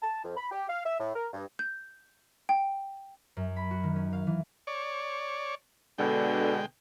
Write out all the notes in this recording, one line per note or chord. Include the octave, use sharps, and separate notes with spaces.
A5
F2
B5
G4
F5
E5
A2
A#4
G2
G6
G5
F#2
B5
F#4
D#3
C#4
F5
E3
C#5 D5
B2 D3 G#3 G5